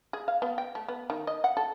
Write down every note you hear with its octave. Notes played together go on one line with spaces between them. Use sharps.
G#4
F5
B3
G5
A3
B3
D#3
D#5
F#5
A4